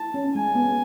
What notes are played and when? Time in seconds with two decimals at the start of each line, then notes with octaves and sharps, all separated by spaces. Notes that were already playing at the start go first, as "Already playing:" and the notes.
Already playing: E4 A5
0.14 C#4
0.35 G#3 G#5
0.55 B3